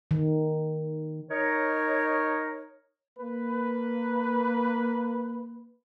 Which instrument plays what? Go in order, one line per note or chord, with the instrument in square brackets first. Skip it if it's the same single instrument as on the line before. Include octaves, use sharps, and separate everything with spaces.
[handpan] D#3
[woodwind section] D#4 A#4 C#5
[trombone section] A#3 B4